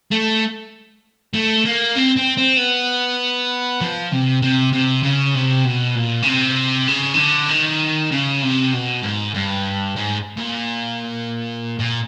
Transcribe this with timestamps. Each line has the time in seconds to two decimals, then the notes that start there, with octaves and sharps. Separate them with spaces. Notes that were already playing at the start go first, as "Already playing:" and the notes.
0.12 A3
1.34 A3
1.65 A#3
1.96 C4
2.17 C4
2.37 C4
2.57 B3
3.81 F3
4.12 C3
4.42 C3
4.73 C3
5.03 C#3
5.35 C3
5.65 B2
5.95 A#2
6.22 C#3
6.27 C3
6.88 C#3
7.14 D#3
7.18 D3
7.49 D#3
8.11 C#3
8.42 C3
8.73 B2
9.03 G#2
9.34 G2
9.96 G#2
10.37 A#2
11.80 A#2